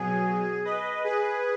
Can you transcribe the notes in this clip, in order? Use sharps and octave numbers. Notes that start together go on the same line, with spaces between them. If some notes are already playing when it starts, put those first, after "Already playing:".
Already playing: B2 F#3 G#4
B4 D#5
G#4 B4